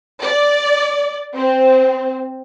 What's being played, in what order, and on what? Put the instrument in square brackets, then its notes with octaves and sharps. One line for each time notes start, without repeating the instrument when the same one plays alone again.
[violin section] D5
C4